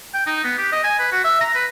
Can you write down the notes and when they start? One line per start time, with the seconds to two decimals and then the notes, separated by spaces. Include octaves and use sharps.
0.14 G5
0.26 D#4
0.44 B3
0.58 G4
0.72 D#5
0.84 G#5
0.99 B4
1.12 F#4
1.24 E5
1.41 A#5
1.54 B4